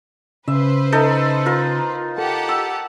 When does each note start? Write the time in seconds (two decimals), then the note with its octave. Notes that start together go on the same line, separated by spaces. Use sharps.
0.48 C#3 B4 C5 E5
0.92 D#4 A4 E5
1.46 F4 A#4
2.18 G4 A4 F#5 A5
2.49 E6